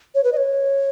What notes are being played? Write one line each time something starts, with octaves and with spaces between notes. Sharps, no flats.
C#5
B4
D#5
C#5